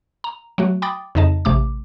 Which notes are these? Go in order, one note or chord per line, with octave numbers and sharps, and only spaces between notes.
A#5
F#3 A3 F#4
G5 B5 D6 D#6 A6
F2 C#3 D#4 D#5 A5
A1 C3 A3 D6